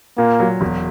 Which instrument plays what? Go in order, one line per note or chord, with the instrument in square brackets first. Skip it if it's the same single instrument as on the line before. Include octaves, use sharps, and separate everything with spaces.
[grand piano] A#2 [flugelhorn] A#3
[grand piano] F#3
E1